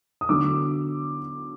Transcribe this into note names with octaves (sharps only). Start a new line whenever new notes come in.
D#6
D3 F#3 B3 D6 E6